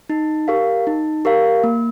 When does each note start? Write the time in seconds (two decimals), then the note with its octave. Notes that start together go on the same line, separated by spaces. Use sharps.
0.09 D#4
0.48 G4 A#4 F5
0.87 D#4
1.25 G4 A#4 F5
1.64 A#3